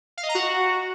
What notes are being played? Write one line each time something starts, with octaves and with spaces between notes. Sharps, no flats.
F5
D#5
A#5
F#4